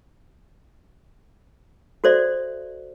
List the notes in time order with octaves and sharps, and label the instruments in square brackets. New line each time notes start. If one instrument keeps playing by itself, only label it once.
[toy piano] F#4 A4 C5 D5 E5